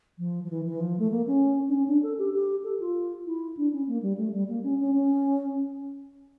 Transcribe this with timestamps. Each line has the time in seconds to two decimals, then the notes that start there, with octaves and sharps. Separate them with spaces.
0.19 F3
0.44 F3
0.50 E3
0.66 E3
0.80 F3
0.99 A3
1.11 A#3
1.27 C#4
1.69 D4
1.72 C#4
1.88 D4
2.03 A4
2.18 G4
2.34 G4
2.64 A4
2.80 F4
3.26 E4
3.57 D4
3.72 C#4
3.87 A#3
4.02 G3
4.17 A3
4.33 G3
4.49 A#3
4.63 C#4
4.80 C#4
4.95 C#4